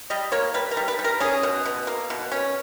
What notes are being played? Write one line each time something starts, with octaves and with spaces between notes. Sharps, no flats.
G3 D#5
A#3 C#5
G3 B4
A#4
G3
B4
G3
A#4
C#4 G#4
B2
B2
A#3
B2
C#4